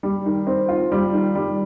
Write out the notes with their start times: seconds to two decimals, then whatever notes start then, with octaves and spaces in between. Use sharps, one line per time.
0.03 G3
0.26 D#3
0.47 C4
0.69 F4
0.92 G3
1.13 D#3
1.35 G3